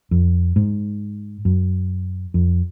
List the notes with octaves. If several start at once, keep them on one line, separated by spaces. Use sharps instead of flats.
F2
G#2
F#2
F2